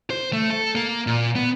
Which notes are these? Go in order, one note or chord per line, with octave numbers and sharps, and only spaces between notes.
C5
A3
A4
A#3
A#2
B3